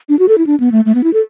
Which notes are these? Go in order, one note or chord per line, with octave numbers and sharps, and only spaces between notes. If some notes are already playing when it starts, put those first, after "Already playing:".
D4
F#4
A4
E4
D4
B3
A3
A3
B3
E4
A4